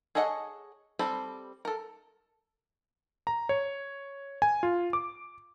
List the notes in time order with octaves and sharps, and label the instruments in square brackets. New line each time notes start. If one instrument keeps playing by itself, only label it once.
[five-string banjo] G#4 A4 C#5 D#5 F#5
G3 C4 A4 B5
A4 A#4
[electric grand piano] A#5
C#5
G#5
F4
D6